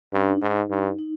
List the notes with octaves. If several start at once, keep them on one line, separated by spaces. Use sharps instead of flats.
G2 C#4
D4
D#4
G#2
G2
D#4